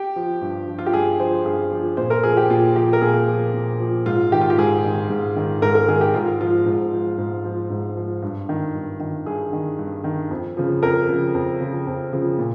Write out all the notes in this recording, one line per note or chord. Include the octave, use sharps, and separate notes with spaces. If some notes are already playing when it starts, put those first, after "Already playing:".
Already playing: G4
F3
G2
F3
F4
G4
G2 G#4
F3 C5
G2 G#4
F3
A#2 C5
A#4
F3 G#4
G4
A#2 F4
F3 G4
A#4
A#2 G#4
F3
A#2
F3
G#2 F4
D#3 G4
F4
G4
G#2 G#4
D#3
G#2
D#3
G#2 A#4
A#4
D#3 G#4
G4
G#2 F4
F3 F4
G#2
F3
G#2
F3
G#2
F3
G2
D#3
G2
D#3
G2 G#4
D#3
G2
D#3
F2
C#3 F3
F2 A#4
C#3 F3
F2
C#3 F3
F2
C#3 F3
A#2